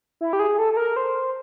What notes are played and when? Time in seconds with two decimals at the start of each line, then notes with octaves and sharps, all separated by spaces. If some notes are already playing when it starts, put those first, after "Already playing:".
0.21 E4
0.33 G4
0.39 G#4
0.58 A4
0.73 A4
0.77 A#4
0.96 C5